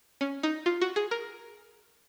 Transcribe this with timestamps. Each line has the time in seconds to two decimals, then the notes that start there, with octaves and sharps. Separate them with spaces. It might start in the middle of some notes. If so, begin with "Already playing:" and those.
0.21 C#4
0.43 D#4
0.66 F4
0.81 F#4
0.96 G#4
1.11 A#4